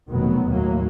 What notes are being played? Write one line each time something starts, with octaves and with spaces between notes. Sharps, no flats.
F1 B2 D#3 F#3 B3
D#2 A2 F#3 A#3